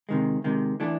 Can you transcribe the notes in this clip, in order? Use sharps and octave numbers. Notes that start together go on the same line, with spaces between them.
C3 D#3 G#3
C3 D#3 G#3
E3 A3 D4